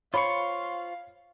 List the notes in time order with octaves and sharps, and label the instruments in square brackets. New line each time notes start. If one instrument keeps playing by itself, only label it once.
[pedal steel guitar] F4 C5 C#6 [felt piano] C#5 B5 [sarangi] F5